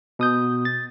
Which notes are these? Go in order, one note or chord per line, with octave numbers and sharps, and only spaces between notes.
B2 D#6 G6
A6